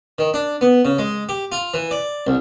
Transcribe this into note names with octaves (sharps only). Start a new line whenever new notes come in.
D#3
D4
B3
C#3
G#3
G4
F4
E3
D5
C2